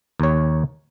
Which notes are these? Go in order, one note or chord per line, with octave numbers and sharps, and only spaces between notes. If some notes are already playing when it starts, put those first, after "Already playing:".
D#2 C#5